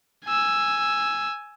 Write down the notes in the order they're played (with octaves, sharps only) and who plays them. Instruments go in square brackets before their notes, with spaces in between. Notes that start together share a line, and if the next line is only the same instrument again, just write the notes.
[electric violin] G#5 E6